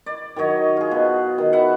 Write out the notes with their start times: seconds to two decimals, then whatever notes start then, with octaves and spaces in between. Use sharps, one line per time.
0.06 D5
0.36 D#3 F#3 C#5 D#5
0.77 F4 G#4
0.91 B2
1.38 D#3
1.53 B4 E5 F#5